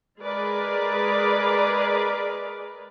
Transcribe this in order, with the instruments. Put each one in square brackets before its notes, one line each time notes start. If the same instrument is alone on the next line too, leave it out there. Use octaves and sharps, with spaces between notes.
[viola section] G#3 G#4 A#4 B4 D5